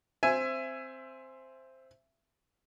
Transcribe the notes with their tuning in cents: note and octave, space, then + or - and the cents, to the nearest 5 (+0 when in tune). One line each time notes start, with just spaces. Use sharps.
C4 +0 E5 +20 G#5 +0